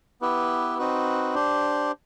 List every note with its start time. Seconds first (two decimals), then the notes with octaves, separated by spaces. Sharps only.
0.21 B3 E4 G4 B4
0.78 C4 D#4 F#4 B4
1.35 D4 G4 C5